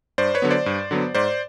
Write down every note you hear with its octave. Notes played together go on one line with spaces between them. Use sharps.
G2 C5 D5
B4 C#5
D3 F#3 B3
C5 D5
G2
D3 F#3 B3
G#2 C5 D5